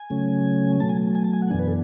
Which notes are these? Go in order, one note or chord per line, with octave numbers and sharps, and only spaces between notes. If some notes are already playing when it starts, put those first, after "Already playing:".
Already playing: G#5
C#3 F#3 A3 C#4
B2 F#3 A3 A5
G#5
G#5
A5
G#5
F#5
F#2 E3 B3 D4 G#5
B4
A4